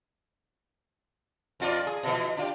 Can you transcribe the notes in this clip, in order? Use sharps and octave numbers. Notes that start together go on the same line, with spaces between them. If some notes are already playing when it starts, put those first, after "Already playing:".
F2 F4 D5
G#4
B2 E3 F3
D4 F4 G4